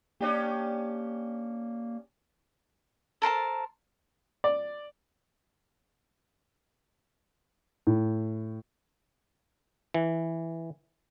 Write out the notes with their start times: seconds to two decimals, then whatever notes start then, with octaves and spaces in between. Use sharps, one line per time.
0.21 A#3 C#4 D4 G4
3.22 A4 A#4 C5 A5
4.44 D5
7.87 A2
9.94 E3